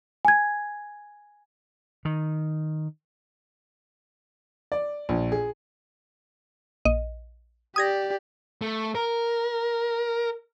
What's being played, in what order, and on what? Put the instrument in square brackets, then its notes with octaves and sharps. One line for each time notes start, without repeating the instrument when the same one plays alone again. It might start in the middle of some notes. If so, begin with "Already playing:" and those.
[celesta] G#5 G#6
[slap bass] D#3
[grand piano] D5
A#1
G#4
[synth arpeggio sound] A#1 D#5
[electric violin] G4 D5 [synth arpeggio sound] D#6 G#6 A#6
[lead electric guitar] A3
A#4